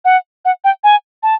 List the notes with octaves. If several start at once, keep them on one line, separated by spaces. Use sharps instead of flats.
F#5
F#5
G5
G#5
A5